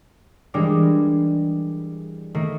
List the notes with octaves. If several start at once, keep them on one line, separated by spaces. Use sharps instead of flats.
E3 G3 G#3 D4 A#4 D5
D#3 A3 A#3